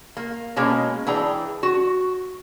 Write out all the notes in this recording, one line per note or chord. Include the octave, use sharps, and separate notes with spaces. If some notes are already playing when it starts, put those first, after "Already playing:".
A#3
B2 G#3 A#3 C#4
E3 D4 G#4 G5 A#5
F#4